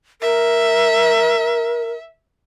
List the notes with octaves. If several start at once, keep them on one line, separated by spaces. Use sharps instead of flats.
A#4 E5